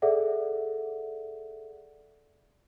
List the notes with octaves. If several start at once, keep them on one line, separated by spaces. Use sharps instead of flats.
G#4 A4 D5 E5 F#5